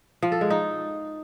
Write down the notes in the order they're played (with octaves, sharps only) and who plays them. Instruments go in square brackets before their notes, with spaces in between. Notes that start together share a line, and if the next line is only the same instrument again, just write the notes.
[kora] F3
A4
G#3
D#4